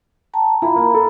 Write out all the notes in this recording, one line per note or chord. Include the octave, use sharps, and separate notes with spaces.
G5 A5 A#5
E4 F4 A#5 B5
A#3
A4